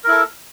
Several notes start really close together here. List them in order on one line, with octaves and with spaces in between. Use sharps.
A#4 E4 A4